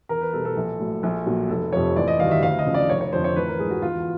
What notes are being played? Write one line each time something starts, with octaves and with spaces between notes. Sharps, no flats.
E2 A#4
B4
B2 G3 A4
A4
A#1
A2 F#3
A#1
A#2 F#3
F1 A4
F2 C3 F3 C#5
A1 D5
D#5
G2 D#3 F#3 F5
E5
D2 F5
D#5
C#3 F3
D5
F1 C#5
C#5
F2 D3 F3 C5
C#5
A1 B4
A#4
G#2 F3 G#4
F#4
E2 F4